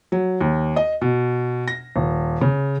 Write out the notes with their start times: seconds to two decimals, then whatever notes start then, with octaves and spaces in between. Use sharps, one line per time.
0.12 F#3
0.41 D#2
0.76 D#5
1.01 B2
1.68 A#6
1.96 D#1
2.41 C#3